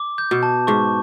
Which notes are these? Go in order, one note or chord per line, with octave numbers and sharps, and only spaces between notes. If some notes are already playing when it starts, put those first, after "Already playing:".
Already playing: D6
G6
B2
A5
G#2 C#6